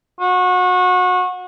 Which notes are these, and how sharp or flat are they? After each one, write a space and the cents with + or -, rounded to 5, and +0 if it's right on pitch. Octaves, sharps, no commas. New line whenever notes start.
F#4 -30